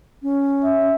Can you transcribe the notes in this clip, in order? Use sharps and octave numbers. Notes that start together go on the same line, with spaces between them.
C#4
E5